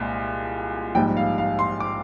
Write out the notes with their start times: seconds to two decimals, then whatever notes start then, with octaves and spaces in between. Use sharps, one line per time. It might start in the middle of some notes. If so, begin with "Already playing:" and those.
Already playing: C2 A#2 G#3
0.95 A#1 G#2 G3 G5
1.17 F5
1.38 F5
1.59 C6
1.80 D6